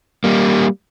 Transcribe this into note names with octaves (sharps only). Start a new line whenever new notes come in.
G3 A#3